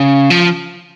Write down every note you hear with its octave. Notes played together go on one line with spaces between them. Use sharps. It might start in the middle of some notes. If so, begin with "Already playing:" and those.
Already playing: C#3
F3